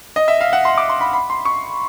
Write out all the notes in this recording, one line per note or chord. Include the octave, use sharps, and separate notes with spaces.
D#5
E5
F5
F#5
C6
D6
C6
B5
B5
C6
C#6